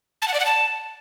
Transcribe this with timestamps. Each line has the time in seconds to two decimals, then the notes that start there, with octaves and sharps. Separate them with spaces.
0.22 A5
0.28 F#5
0.34 D5
0.40 F#5
0.46 A5